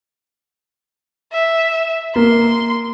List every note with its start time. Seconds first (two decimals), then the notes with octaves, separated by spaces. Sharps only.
1.33 E5
2.16 A#3 C6